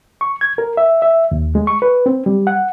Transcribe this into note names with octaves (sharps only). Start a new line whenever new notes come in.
C#6
G#6
A#4
E5
E5
D#2
G#3
C#6
B4
C4
G3
F#5